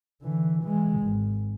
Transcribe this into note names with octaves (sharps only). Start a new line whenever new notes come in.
D3 E3
E3 G#3
G#1